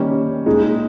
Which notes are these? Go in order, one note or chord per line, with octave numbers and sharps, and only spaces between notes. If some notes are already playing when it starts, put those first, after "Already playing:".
Already playing: D#3 G3 A#3 C#4 G5
A#2 G#3 D#4